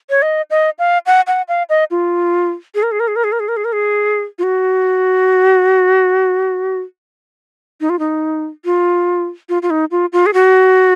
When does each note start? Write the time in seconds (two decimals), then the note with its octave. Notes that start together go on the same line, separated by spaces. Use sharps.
0.10 C#5
0.22 D#5
0.50 D#5
0.79 F5
1.06 F#5
1.27 F#5
1.48 F5
1.69 D#5
1.91 F4
2.75 G#4
2.83 A#4
2.91 G#4
3.00 A#4
3.08 G#4
3.16 A#4
3.24 G#4
3.32 A#4
3.40 G#4
3.48 A#4
3.57 G#4
3.64 A#4
3.72 G#4
4.39 F4
4.43 F#4
7.81 D#4
7.89 F4
7.99 D#4
8.65 F4
9.49 F4
9.62 F4
9.70 D#4
9.91 F4
10.12 F4
10.26 G#4
10.34 F#4